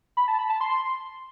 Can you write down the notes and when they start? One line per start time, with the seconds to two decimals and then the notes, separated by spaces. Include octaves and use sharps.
0.17 B5
0.28 A5
0.39 B5
0.50 A5
0.61 C6